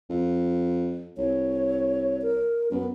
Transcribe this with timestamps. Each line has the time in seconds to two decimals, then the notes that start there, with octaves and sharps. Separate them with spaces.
0.10 F2
1.18 C2 C#5
2.22 A#4
2.71 F#2 B3